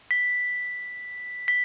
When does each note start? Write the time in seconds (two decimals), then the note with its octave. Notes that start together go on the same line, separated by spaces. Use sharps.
0.11 B6
1.48 B6